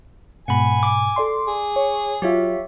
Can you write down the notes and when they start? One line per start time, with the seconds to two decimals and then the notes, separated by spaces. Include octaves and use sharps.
0.48 G#2 B2 F#5 G#5 B5
0.83 D6
1.16 A4 D5 C6
1.47 G#4
1.76 C#5
2.22 F#3 F4 G4 C#5 E5